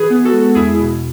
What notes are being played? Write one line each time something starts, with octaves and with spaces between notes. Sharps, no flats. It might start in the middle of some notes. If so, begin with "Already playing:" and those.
Already playing: E3 G#4 B4
B3
F#4 A4
G#3
E2 E4 G#4
B2